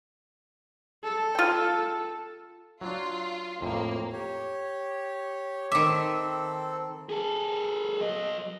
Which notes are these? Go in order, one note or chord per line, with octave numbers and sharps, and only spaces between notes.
A4
F4 G5
F#3 D4 F4
F2 A2 A#3
G4 C#5
D#3 C4 A4 E5 D6
G#4 A4
F#3 D#5